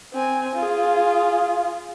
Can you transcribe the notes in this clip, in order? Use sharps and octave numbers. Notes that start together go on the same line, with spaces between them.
C4 G#5
F4 G#4